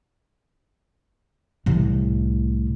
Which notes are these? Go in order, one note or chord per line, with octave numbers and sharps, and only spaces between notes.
C2 A2